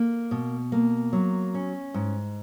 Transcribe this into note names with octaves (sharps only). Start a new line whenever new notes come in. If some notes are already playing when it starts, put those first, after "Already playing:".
Already playing: A#3
B2
A#3
F#3
C#4
G#2